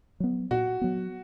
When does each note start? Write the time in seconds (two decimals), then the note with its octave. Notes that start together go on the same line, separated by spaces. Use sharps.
0.20 F#3 B3
0.51 A#2 F#4
0.81 F#3 B3